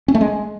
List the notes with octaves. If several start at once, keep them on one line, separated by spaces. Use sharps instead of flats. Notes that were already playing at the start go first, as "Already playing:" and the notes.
C#4
A3
G#3